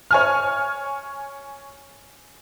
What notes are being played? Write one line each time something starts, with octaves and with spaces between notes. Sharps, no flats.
C#5 G#5 F6